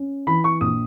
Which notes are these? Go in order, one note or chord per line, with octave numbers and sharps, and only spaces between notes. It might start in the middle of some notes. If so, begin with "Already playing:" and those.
Already playing: C#4
E3 B5
C#6
A#1 D#6